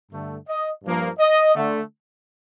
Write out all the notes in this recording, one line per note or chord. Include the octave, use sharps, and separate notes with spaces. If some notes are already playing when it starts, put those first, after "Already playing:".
G2 D3 A3
D#5
G2 F3 A#3
D#5
D3 A3